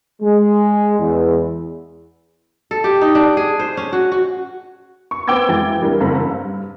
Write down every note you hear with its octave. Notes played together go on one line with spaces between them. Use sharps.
G#3
E2
A4
G4
D#4
D4
G#4
C5
C#4
F#4
F#4
C#6
B3 C5 G5 D6 E6 G#6
F2 E3 G#3 G5 A6
E3 G3 D4 A#4
F#1 C4 A4 A#5 B5
G2